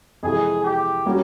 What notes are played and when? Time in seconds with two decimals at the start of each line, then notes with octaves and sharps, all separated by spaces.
0.23 F2 C3 E3 G#3 G#4
0.64 G4
1.06 G3 A#3 C#4 F#4